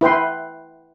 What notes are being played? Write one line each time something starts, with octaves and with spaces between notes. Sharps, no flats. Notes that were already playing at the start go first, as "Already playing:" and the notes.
E4 B4 G5 C6